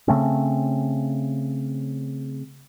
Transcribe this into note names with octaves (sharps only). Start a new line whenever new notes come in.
C#3 A3 C4 C#4